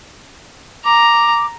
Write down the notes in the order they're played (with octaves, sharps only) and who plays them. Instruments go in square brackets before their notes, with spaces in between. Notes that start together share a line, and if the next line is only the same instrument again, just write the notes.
[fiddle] A#5 [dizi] D6